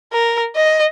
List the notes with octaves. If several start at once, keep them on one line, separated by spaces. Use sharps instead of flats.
A#4
D#5